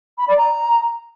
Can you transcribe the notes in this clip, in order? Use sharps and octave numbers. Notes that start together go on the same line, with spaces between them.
B5
D5
A#5